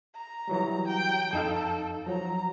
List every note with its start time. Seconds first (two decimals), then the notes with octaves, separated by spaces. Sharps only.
0.15 A#5
0.48 E3 F#3 G3
0.88 G5
1.33 F2 D#4 A4 F5
2.06 F3 F#3 A#5